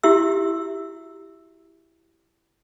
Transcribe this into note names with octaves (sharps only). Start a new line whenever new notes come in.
E4 F#4 G4 E5 E6